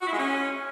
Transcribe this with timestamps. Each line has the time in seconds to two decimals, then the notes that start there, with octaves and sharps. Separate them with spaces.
0.02 F#4
0.07 E4
0.13 G#3
0.18 C#4